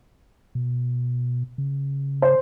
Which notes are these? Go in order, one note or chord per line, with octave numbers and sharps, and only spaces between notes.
B2
C#3
C5